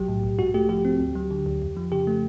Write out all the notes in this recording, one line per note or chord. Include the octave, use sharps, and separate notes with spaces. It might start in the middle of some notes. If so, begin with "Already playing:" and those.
Already playing: B1 F#3 G4
A2
B1
G#2 F#4
A3 G4
F3 G4
C4
D2
F#3
D3
D2
F2
F3
C#3 G4
A3